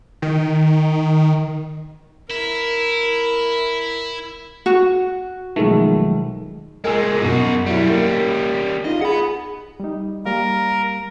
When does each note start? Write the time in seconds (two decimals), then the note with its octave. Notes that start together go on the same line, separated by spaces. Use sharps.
0.22 D#3
2.30 E4 A#4
4.66 F#4
5.56 B1 D#3 F3 G#3 A3
6.84 A#2 G#3 A#4 G#5 E6
7.22 F#2 B2 D#4 F#4
7.66 F#3 G3 C#4 E4
7.89 A#3
8.84 D#4 F4 D#5
9.01 G#4 F#5 B5
9.80 G3 D#4
10.25 G3 A#3 A#4 F5